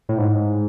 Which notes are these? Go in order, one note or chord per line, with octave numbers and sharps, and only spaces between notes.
A2
G#2